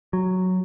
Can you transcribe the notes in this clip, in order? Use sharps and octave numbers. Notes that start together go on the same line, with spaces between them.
F#3